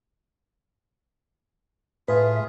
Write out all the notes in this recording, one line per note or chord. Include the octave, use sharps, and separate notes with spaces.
A2 F4 G#4 B4 E5